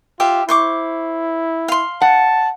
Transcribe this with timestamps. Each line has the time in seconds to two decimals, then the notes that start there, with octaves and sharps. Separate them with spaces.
0.20 F4 G4 E5 F5
0.49 E4 C5 C#6 D6
1.68 F5 C6
2.01 F#5 A5